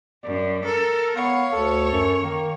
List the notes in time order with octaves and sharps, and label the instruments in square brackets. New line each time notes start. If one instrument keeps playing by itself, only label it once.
[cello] F#2 [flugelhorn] D5
[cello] A4 [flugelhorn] A#4
[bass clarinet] B3 [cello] C#5 [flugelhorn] F5
[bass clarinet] D2 [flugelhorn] A4
[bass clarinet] F#2
[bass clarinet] D#3 [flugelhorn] A#3